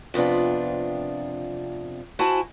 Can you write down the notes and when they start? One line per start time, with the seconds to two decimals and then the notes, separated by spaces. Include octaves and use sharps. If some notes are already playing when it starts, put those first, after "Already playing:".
0.14 F2 C3 B3 D4 F4
2.19 E4 F#4 C5 G#5 A5